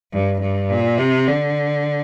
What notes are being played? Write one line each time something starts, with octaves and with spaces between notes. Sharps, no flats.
G2
G2
A#2
C3
D3